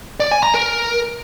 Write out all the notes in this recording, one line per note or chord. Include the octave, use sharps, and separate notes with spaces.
D5
G#5
A#5
A#4